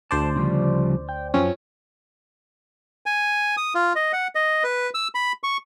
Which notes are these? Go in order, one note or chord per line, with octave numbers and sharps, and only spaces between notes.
D2 C5 D5 A5
C#3 F3 G3
G5
F#2 F3 C4 C#4
G#5
D#6
F4
D#5
F#5
D#5
B4
E6
B5
C#6